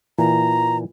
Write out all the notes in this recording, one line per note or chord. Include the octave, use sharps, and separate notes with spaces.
A#2 E3 A#5